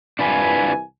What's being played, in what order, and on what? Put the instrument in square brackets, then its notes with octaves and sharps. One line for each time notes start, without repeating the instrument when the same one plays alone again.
[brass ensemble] C2 E3 G#5 [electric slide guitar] D4 F4 B4